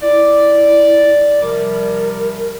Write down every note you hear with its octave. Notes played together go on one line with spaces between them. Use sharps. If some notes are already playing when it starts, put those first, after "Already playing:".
E4 D5
C3 F3 G3 A#4